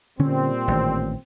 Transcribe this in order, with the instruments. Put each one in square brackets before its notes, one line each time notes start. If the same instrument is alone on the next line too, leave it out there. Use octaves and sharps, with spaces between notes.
[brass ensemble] A#2 G3 C4 [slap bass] D3 C#4
[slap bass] A1 D#3